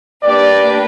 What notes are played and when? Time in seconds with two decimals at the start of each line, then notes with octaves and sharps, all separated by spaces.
0.23 A#3 D4 G4 B4 D5